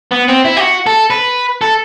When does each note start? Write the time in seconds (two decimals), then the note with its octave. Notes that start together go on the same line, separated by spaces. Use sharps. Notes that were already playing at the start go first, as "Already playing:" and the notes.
0.11 B3
0.28 C4
0.45 E4
0.57 G4
0.60 F#4
0.87 A4
1.10 B4
1.61 A4